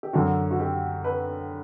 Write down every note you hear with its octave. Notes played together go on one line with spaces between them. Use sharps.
G4
F#2 D3 F#4
F#4
G4
B4